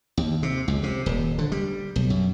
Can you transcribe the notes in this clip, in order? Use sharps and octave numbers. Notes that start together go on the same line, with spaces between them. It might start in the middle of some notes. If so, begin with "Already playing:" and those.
D#2
C3
C#2
C3
D#1
D3
G3
B1
F#2